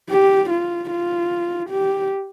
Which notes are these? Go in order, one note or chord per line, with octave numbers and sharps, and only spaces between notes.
G4
F4
F4
G4